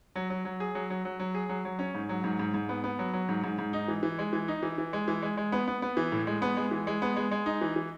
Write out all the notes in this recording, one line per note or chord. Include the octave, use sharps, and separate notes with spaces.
F#3
F#3
F#3
G#4
F#3
F#3
F#3
F#3
G#4
F#3
F#3
C#4
G#2
F#3
G#2
G#2
G#2
B3
B3
F#3
F#3
G#2
G#2
G#2
D#4
E3
E3
G#3
E3
D#4
E3
E3
G#3
E3
G#3
G#3
B3
B3
B3
E3
A2
G#3
B3
G#3
E3
G#3
B3
G#3
G#3
D#4
E3
E3